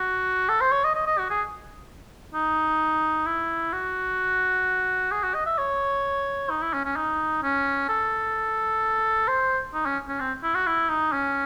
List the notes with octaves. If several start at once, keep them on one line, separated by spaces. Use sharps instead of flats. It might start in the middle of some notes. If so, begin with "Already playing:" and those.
Already playing: F#4
A4
C5
C#5
D#5
D#5
D#5
F#4
G#4
D#4
E4
F#4
G#4
F#4
D#5
E5
C#5
D#4
E4
C#4
C#4
D#4
C#4
A4
C5
D#4
C#4
C#4
C4
E4
F#4
E4
D#4
C#4